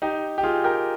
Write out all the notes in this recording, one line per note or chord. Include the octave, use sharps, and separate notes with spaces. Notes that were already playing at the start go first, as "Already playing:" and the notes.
D#4 G4
G4
F4 G#4
G4 A#4